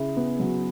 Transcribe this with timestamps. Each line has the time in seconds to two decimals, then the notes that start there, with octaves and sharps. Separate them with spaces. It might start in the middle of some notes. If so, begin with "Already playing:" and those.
Already playing: C#3 E4 G#4
0.17 B3
0.40 F#3